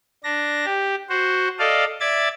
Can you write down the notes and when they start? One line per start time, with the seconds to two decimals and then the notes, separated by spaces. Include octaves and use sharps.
0.24 D4 A#6
0.65 G4
1.09 F#4 C5
1.59 A4 D5 D#5 F5
2.00 D5 E5 G#6 A6